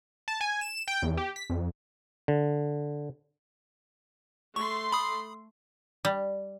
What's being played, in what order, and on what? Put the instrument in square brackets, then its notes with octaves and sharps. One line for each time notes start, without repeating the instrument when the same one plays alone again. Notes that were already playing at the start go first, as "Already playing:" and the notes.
[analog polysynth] A5
G#5
E7
G5
E2
G4
B6
F2
[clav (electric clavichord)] D3
[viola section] A3 C6 [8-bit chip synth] C#6
[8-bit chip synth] B5 D#6
[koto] G3